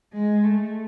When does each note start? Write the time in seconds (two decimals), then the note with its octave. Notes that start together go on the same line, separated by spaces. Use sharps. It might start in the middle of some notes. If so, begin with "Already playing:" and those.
0.13 G#3
0.44 A3